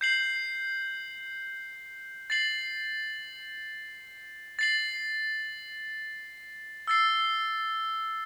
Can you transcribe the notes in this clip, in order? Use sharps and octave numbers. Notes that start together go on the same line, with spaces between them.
G6 C7 F#7
A6 C7 F#7
A6 C7 F#7
E6 A6 C7